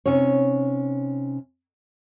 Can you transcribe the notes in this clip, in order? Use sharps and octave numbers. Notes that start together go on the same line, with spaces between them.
C3 C#4 D#4 C#5